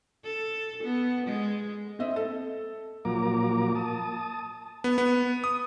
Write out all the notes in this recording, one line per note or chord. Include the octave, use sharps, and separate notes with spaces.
A4
B3
G#3
C4 D#5 E5
A4
A#2 F3 F#3 A#3 A#5 D6
A5 D#6
B3
B3
D#6